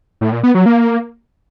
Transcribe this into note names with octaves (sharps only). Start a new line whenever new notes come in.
A2
A#2
B3
F#3
A#3